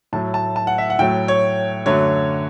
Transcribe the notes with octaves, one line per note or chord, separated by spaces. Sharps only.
A2 F#3 A3 A5
A5
A5
F#5
E5
F#5
A2 F#3 A3 G5
C#5
F#2 D3 F#3 A3 C#5